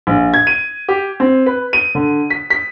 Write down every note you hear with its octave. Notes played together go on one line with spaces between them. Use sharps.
A#1
G#6
D#7
G4
C4
B4
D#7
D3
B6
B6